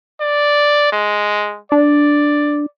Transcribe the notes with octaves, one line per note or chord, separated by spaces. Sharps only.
D5
G#3
D4 D5